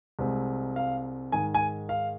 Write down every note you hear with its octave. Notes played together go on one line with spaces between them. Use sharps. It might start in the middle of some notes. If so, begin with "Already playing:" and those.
C2 C3 G#3 C4
F5
G#2 D#3 G#3 G#5
G#5
F5